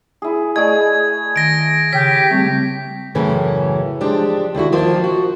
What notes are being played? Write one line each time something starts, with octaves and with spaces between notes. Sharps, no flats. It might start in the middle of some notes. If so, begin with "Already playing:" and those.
E4 G#4
A3 G#4 D5 D#5 G#6
D#3 A#6 D7
C#3 G4 B6
G3 A3 C4
F#2 A2 C#3 E3 C#4
F3 G#3 D4 G4
D#2 D3 E4 F#4
D#3 F3 A#3 F4
F#4